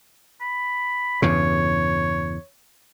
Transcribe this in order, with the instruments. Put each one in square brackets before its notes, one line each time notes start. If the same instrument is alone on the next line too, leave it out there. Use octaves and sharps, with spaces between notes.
[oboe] B5
[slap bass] E2 G2 C#3 [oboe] C#5